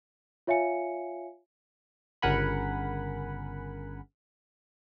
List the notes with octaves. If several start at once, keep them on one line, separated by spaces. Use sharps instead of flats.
F4 C#5 E5 F5 G#5 C#7
G1 C#3 A#4 F#5 G#5 B5